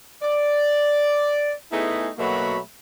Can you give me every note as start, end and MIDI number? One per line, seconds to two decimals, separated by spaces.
0.23 1.53 74
1.72 2.09 57
1.72 2.09 59
1.72 2.09 63
1.72 2.09 64
1.72 2.09 68
2.18 2.58 47
2.18 2.58 54
2.18 2.58 57
2.18 2.58 58
2.18 2.58 66
2.18 2.58 83